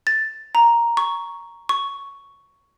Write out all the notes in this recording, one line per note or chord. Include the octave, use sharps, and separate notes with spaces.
A6
A#5
C#6
C#6